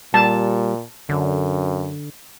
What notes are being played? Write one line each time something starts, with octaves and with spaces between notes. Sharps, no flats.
A#2 G3 A5
F#2 D3